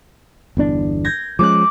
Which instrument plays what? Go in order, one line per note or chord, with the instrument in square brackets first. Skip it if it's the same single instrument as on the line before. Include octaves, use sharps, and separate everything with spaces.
[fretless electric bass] G1 E2 D4
[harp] G6 G#6 A#6
[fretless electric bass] F3 G#3 C#4 [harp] D6 F#6